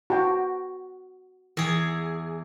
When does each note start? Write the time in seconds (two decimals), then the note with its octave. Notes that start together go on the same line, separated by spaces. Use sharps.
0.10 F#4 G5
1.57 E2 G#4